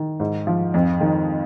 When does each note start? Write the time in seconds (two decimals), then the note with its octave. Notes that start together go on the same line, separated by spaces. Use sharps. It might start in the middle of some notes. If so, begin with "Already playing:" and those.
Already playing: D#3
0.20 G#2
0.47 F3
0.74 F2
1.00 D#3